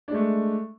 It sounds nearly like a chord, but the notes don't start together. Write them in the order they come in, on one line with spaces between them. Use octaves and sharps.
D4 G#3 A3